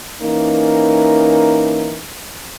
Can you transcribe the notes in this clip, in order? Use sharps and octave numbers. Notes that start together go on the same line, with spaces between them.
E3 A#3 C#4 D#4 A#4